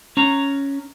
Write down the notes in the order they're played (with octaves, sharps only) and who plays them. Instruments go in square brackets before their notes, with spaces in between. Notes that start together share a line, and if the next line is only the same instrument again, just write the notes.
[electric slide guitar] C#4 A#5